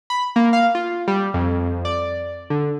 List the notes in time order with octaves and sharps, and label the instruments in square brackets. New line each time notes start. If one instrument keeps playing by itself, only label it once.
[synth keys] B5
A#3
F5
F4
G3
F2
D5
D3